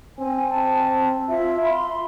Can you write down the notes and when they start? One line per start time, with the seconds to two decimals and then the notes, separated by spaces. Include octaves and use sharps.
0.19 C4 G#5
0.50 A5
0.95 C4
1.29 F4 E5
1.63 B5 C6